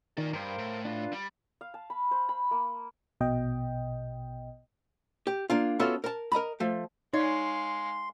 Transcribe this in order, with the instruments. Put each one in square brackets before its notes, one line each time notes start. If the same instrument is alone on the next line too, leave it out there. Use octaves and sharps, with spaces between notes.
[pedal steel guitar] D#3 [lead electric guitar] F4 D5
[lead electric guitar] G2 [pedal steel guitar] A#4 C5 F5
[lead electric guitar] A2
[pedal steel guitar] D4 F4 B4
[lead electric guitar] G3
[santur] F5
A5
B5
C5
B5
A#3
[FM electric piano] A#1 B2 D#5 G5
[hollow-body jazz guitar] G4
A#3 D4 F4
B3 C#4 F4 F#4 A4 E5
A#4 A5
A#4 D#5 A#5 B5
F3 A3
[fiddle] G#3 F5 [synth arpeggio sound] D#4 [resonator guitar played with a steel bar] C#5 [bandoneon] C6